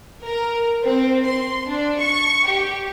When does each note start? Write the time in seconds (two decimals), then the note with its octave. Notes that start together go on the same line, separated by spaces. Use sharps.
0.24 A#4
0.84 C4
1.25 C6
1.67 D4
1.99 C#6
2.46 G4